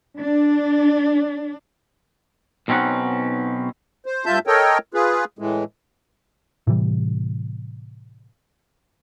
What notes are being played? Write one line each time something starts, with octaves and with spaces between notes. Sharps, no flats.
D4
B1 B2 C4 C#4 D#4 F#5
C5
G2 F4 E5 A5 G6
A4 A#4 C#5 D#5 G5
F4 G#4 B4
A2 E3 G#3
A2 C3 E3 G3